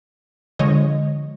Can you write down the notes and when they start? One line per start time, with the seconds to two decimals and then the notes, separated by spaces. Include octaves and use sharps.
0.59 D3 F3 G#3 C#5 D#5